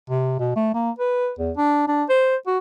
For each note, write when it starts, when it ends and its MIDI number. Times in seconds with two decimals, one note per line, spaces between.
0.09 0.38 48
0.39 0.53 47
0.56 0.74 57
0.74 0.91 58
0.98 1.32 71
1.39 1.51 40
1.57 1.85 62
1.88 2.04 62
2.09 2.36 72
2.47 2.58 66